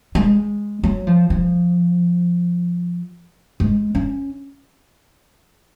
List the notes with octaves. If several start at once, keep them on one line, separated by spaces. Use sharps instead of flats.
G#3
F#3
F3
F3
G#3
C#4